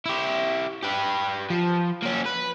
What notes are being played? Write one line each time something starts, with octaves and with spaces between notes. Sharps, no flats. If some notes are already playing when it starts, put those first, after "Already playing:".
E4 G4
G4 B4
F3
A#3 C#4
B4